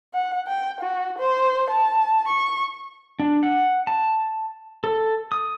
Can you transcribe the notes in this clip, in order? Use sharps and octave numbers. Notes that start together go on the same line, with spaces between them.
F#5
G5
F#4
C5
A5
C#6
D4
F#5
A5
A4
D#6